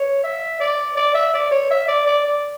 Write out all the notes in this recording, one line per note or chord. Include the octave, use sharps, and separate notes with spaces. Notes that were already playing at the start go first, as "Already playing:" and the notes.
Already playing: C#5
E5
D5
D5
E5
D5
C#5
E5
D5
D5
D5